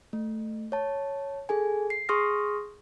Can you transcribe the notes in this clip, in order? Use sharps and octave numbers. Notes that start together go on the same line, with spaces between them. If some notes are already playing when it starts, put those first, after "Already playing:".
A3
C#5 A5
G#4 A4 G#5
C7
G#4 C6 C#6 D#6 F6 A#6